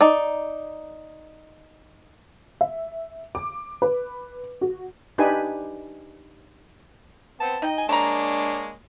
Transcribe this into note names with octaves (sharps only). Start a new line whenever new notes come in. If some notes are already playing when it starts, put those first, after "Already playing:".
D#4 D5
E5
D6
B4
F#4
D4 D#4 G4 B4 G#5
B3 C4 A5
D#4 D#5 G5
G#5
G#3 A#3 D4 C#5 A5 A#5